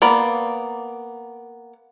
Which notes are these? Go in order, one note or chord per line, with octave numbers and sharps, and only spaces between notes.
A#3 B3 D5